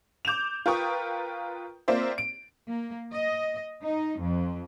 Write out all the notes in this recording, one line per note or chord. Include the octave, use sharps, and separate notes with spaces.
D6 G6 E7 F7
F4 A#4 B4 G5 C#6 D#6
A#3 C4 F4 C5 D5 E5
D7
A#3
D#5
D#4
F2